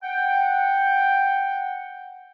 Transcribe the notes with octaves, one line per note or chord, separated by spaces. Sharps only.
F#5 G5